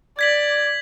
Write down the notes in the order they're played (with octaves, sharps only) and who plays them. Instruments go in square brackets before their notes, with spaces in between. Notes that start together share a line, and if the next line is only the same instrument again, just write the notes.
[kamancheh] D5 [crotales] G#6 B6 F#7